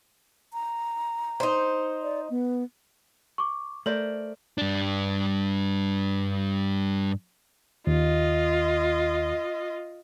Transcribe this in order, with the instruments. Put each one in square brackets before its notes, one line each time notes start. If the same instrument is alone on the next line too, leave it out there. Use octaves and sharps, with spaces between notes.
[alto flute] A#5
[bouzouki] D#4 C5
[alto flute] D5
B3
[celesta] C#6 D6
[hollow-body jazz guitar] A3 [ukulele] A#4 C5 D5 [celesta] F#7
[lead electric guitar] G2 D4
[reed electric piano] D#2 [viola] F4 D#5